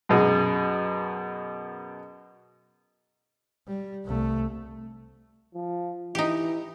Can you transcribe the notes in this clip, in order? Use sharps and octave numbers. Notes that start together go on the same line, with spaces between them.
F#2 B2 G#4
G3
C2 A3
F3
E3 D#4 G4